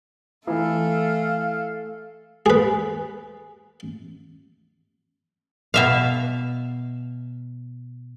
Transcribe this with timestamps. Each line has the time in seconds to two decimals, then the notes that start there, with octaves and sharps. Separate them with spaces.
0.47 E3 A3 A4 F5
2.46 G#4 B4
5.74 B2 E5 F5